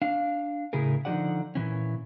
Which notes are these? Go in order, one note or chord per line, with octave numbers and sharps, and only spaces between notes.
D4 F5
A2 C#3 E4 G#4 A#4
D3 F3 D#4 F#4 D5 F#5
A#2 E3 C#4